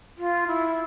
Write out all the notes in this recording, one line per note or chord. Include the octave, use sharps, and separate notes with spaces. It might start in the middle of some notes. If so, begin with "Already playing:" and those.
F4
E4